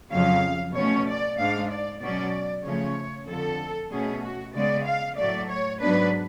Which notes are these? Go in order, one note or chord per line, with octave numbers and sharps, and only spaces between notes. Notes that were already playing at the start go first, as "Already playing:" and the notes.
F2 C#3 F#3 F5
B2 A3 C#4 C#5
D5
G#2 G#3 D4 F5
D5
B2 F#3 C#4 D5
C#3 F3 A3 C#4 C#5
F2 D3 F3 A4
B2 A3 C#4 G#4
F#4
C#3 G#3 B3 D5
F5
A2 F#3 A3 D5
C#5
G#2 F#3 B3 D4 B4